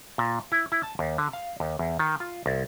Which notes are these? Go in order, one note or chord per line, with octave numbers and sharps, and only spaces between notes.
A#2
E4
E4
A5
D#2
D3
F5
D#2
E2
D#3
F4
C2